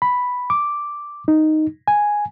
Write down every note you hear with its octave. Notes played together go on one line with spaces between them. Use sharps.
B5
D6
D#4
G#5